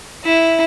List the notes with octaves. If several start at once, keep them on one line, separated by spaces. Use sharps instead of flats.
E4